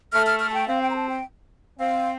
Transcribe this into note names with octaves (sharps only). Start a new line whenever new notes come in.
A3 F6
F6
F6
A5
G5
C4 F5
G5
A#5
A5
G5
C4 F5